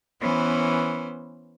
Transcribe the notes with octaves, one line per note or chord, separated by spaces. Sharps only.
E3 B3 C#4 C5